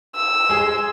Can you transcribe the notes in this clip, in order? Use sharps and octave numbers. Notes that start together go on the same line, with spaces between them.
E6
G#3 G#4